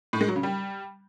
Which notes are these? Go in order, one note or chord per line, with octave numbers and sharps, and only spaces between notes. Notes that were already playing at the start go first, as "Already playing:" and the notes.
A2
G#3
F#3
C#3
G3